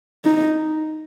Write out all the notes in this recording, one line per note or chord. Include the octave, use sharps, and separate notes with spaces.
D#4